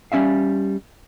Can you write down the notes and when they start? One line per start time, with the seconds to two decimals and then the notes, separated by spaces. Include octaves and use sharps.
0.12 G3 C#4 E5 F5